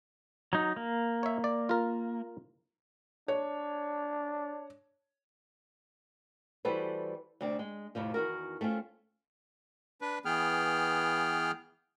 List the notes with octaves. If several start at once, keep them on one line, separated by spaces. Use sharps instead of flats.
F#3 D#4
A#3
C#5 E5
D5
F4 A#4
D4 C#5
E3 G3 F#4 A4 B4 C5
D2 C3 C4 D4 D5
G#3
F2 A2 C3 F3
E2 D#3 F#4 A#4
A3 C4 C#4 F4
D4 B4
E3 B3 G#4 G5 F6